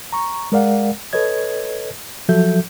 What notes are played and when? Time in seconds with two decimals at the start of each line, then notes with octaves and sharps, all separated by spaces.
0.13 A#5 C#6
0.52 G#3 A#4 D5 F5 F#5
1.13 A4 B4 C#5 D#5 G#6
2.29 F3 F#3 F#4 A4 E5 G6